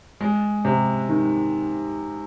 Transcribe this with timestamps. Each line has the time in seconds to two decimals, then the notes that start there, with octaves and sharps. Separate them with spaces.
0.21 G#3
0.65 C3
1.09 D#3